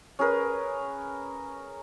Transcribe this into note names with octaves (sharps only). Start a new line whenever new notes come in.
C#4 G#4 A#4 B4